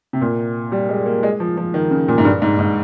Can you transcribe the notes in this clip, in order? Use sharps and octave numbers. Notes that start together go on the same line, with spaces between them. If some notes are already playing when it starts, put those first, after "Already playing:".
C3
A#2
G3
G#3
A#3
G#3
F3
F3
D#3
C#3
A#2
G#2
G2
G#2
G#2